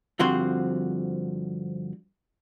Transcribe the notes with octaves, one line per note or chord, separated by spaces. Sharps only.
G2 D3 F3 C4 F#4 C6